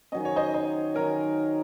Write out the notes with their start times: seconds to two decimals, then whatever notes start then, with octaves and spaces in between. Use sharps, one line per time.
0.12 D#3 F#3 C#4 D#5
0.25 C#5
0.36 C5 D#5
0.54 C5 D#5
0.95 D#3 F#3 C#4 A#4 C#5